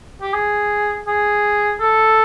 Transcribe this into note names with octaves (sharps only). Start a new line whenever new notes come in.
G4
G#4
G#4
A4